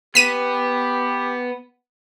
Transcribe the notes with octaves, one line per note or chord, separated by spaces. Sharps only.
B3 G4 B6 D#7